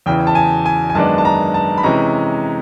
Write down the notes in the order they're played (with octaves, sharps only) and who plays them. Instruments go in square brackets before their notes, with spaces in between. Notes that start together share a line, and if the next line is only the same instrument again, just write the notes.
[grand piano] E2 C#3 E3 G5
A5
G#5
G#5
G#5
F#2 D#3 G#3 B3 D4 A5
A5
A#5
A5
B5
C3 E3 G#3 C#4 A#5